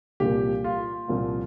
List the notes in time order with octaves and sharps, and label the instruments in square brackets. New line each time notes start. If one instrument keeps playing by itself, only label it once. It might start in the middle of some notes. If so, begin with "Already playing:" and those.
[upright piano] C2 A#2 F3 A#3 [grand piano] G4
[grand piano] F4
[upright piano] C2 A#2 F3 A#3